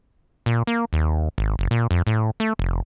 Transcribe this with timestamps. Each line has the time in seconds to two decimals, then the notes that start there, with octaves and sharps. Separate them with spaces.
0.46 A#2
0.67 A#3
0.93 D#2
1.38 G#1
1.59 F#1
1.71 A#2
1.91 F2
2.07 A2
2.40 A3
2.59 F1